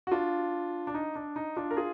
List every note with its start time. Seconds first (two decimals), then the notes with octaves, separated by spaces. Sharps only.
0.07 F#4
0.11 D4 F4
0.87 D4
0.94 D#4
1.15 D4
1.36 D#4
1.56 D4 F4
1.71 A#4
1.77 F4 G#4